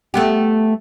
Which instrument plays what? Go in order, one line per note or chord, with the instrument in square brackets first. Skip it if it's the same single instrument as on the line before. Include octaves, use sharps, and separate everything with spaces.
[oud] A3 B3 G4